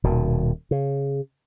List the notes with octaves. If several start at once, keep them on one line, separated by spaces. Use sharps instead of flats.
D#1 B2 D#3
C#3